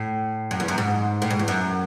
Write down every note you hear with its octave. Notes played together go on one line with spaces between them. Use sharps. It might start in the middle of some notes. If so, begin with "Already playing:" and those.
Already playing: A2
F#2
E2
F#2
G#2
A2
G#2
E2
F#2